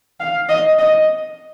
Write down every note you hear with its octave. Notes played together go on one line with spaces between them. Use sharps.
F5
D#5
D#5